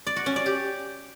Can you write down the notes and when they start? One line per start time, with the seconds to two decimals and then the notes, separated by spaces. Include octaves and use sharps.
0.07 D5
0.16 F#4
0.26 C#4
0.36 D5
0.46 G4